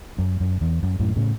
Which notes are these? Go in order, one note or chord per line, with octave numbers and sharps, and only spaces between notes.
F#2
F#2
E2
F#2
F#2 A2
A2 C#3